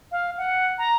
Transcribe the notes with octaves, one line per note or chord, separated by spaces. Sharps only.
F5
F#5
A#5